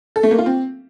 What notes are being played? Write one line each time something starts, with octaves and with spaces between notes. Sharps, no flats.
A4
A3
A#3
F4
C4